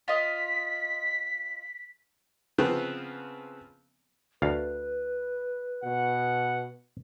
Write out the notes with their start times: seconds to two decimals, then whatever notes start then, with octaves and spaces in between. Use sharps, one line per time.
0.08 F4 D#5 B6
2.58 C#3 F3 B3 C4
4.42 D2 B4 F5
5.84 B2 F#5